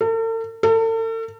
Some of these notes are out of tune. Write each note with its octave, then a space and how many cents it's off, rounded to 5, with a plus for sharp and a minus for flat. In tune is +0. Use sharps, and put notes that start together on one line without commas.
A4 +45
A4 +40